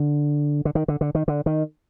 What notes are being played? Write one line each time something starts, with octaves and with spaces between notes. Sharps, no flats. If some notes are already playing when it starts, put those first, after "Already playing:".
Already playing: D3
D3
D#3
D3
D3
D#3
D3
D#3